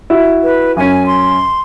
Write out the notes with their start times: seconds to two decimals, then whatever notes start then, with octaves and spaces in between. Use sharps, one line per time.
0.10 E4 F#4 E5
0.43 B4
0.77 F#2 C#4 G#5
1.06 C6